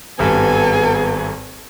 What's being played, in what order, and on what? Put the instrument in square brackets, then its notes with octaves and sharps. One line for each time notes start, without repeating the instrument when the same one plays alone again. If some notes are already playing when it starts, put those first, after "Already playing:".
[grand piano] G#1 G2 [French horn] B3 [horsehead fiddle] A4 G#5